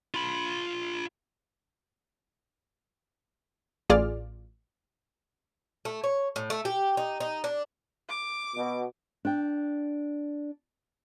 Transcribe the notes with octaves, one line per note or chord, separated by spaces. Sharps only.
F4 B5
A1 F4 G#4 D5 F6
A3
C#5
A2
A3
G4
D#4
D#4
D4
D6
B2
D4 G5